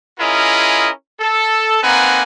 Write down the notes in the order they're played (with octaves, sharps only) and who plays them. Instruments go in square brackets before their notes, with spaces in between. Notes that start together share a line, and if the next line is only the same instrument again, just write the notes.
[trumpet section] C#4 E4 F4 G#4 A#4 D#5
A4
A#3 C4 D#4 B4 F#5 G#5